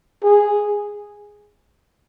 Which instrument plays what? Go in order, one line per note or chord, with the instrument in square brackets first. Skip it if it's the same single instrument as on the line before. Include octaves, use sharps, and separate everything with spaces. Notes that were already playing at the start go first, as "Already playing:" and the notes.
[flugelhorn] G#4